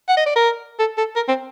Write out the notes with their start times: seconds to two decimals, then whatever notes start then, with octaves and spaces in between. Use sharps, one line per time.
0.09 F#5
0.17 D#5
0.26 D5
0.36 A#4
0.79 A4
0.98 A4
1.16 A#4
1.28 C4